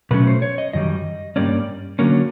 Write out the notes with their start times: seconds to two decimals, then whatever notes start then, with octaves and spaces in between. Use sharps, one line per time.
0.11 B2 F#3 A3 C#4 B4
0.27 C5
0.42 C#5
0.58 D#5
0.73 F#2 D#3 G3 D#5
1.36 G2 E3 G3 A#3 C#4 D5
1.99 D3 F#3 A#3 C#4